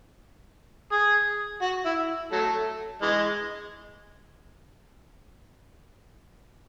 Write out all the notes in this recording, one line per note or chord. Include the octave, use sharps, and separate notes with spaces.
G#4
F#4
E4
F#3 A3
E3 G#3